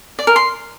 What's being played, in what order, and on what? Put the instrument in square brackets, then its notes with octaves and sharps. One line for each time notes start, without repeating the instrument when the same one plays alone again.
[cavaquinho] D5
A#4
C6